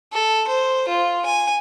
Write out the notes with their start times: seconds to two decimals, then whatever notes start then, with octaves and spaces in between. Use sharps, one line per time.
0.13 A4
0.48 C5
0.89 F4
1.26 G#5